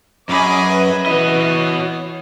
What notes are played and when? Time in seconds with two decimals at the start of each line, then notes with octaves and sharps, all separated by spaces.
0.29 F#2 G#4 D#5 G#5 B5 D6
0.65 B4 E5
1.06 E3 F#4 D#5
1.58 C#5